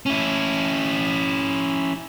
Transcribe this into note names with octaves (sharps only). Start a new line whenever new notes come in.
C#4 E4